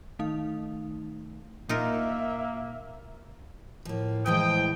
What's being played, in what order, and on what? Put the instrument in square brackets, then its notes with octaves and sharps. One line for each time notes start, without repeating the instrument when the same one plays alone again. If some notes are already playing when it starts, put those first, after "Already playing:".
[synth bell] D#3 A3 D#4 F5
[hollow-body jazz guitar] A#2 [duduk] A#3 [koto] D#4 F4 A#4 [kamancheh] E5
[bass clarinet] A2 [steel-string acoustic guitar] F3 A#3
[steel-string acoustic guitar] A2 E3 G#3 [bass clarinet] F3 [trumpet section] G5 [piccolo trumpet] D#6